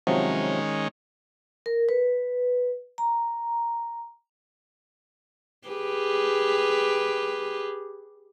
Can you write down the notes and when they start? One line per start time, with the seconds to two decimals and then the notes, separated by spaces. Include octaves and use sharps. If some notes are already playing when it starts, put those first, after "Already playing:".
0.07 C3 D#3 F3 F#3 G#3 C#4
1.66 A#4
1.89 B4
2.98 A#5
5.68 G4 G#4 B4